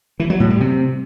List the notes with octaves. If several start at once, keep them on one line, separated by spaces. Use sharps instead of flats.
E3
F#3
A2
G3
C3